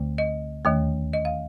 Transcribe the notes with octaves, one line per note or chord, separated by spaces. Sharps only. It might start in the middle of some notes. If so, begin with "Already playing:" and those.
Already playing: D2 D3 A3
D#5
D#2 D#3 A3
D#5
F5